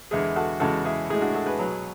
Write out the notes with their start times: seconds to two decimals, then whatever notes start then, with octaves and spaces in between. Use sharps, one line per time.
0.11 E2 D3 G#3 E4 G#4
0.36 F#4 A4
0.60 E2 C#3 G#3 F#4 A4
0.85 E4 G#4
1.10 A2 E4 G#4
1.14 G#3
1.21 D4 F#4
1.34 F#4 A4
1.46 G#4 B4
1.59 B2 F#3